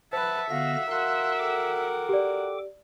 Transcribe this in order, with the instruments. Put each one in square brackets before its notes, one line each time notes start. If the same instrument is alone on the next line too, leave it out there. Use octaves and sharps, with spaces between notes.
[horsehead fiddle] B4 A5 [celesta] C5 [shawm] E5 [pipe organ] F#5
[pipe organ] D3 B3 A#6 [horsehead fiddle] F#4 F5
[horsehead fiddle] F#4 A#4 [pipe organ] F5 C6 F#6
[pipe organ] A4 G5 D6
[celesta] G4 D5